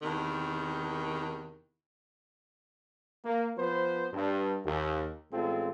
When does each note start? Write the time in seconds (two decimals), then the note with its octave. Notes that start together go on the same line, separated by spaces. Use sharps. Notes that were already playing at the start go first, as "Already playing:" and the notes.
0.02 E2 C3 D#3
3.25 A#3
3.57 F3 B3 B4 C5
4.13 G2
4.65 D#2
5.32 A1 G#3 C4 F4 A4